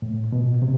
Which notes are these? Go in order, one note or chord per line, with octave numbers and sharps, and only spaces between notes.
A2
B2
C3